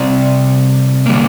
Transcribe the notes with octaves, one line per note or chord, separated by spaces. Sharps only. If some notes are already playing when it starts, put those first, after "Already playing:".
Already playing: C3 G3 C4 D5
D3 G3 A#3